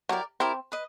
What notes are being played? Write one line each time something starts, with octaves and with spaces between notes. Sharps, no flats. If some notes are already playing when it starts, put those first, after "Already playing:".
F#3 E4 G4 A#4 D5
C4 E4 G4 A#4 D5
B4 D#5